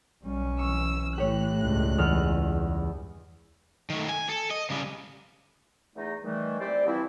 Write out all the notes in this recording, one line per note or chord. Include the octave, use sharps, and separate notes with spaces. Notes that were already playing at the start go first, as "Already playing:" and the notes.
B1 G3 C#4
E3 C#6 E6
A2 E3 G4 C#5 F#6
C#2 G2
E2 F6
D#3 A3
G#5
A4
D#5
C#3 G3
E2 A3 D#4
D#3 E3 G3 A3
C4 E4 G4 C5 D5
E3 F3 G3 C4 E4